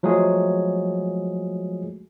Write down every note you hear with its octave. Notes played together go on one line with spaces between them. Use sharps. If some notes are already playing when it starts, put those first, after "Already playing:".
F3 F#3 G#3 A3 G#4